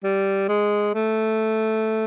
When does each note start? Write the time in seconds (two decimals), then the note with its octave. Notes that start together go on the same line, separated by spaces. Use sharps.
0.04 G3
0.48 G#3
0.94 A3